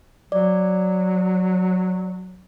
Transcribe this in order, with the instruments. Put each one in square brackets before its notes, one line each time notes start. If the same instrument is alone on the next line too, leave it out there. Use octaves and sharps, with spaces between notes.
[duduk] F#3 [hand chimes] D5